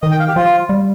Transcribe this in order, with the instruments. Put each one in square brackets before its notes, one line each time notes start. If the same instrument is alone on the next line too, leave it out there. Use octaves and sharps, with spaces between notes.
[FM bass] D#3 [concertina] D#5
[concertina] G5
F5
G4
[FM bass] F3 [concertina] F4
[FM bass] G3